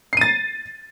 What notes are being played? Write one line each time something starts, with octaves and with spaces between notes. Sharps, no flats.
A6 C7 D#7